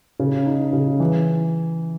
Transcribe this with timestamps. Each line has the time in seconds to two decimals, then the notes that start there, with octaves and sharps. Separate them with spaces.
0.20 C#3
0.46 D#4
0.73 C#3
1.00 E3